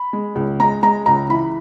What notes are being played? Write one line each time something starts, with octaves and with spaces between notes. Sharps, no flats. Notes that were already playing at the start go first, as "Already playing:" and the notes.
Already playing: B5
G#3
C#2
G#3 A#5
G#3 A#5
C#2 A#5
E3 B5